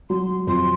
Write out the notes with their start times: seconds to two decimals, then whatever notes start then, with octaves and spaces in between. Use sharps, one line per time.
0.09 F#3 C6
0.47 F2 C6